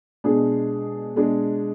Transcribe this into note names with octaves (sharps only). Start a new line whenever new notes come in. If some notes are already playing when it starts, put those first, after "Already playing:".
B2 G#3 D4 G#4
B2 G#3 D4 G#4